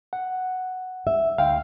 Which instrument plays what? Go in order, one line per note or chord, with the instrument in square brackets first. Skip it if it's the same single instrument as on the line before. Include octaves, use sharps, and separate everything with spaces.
[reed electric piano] F#5
[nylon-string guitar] E5
[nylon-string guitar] D2 [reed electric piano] F5 G5